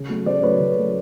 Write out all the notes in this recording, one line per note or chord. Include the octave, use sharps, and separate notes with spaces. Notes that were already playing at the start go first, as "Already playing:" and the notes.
Already playing: C#3
F#3 A3
C#3 C5 D5
F#3 A3 B4 C#5
C#3
F#3 A3